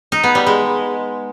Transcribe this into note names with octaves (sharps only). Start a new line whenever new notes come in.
D#4
B3
G3
G#3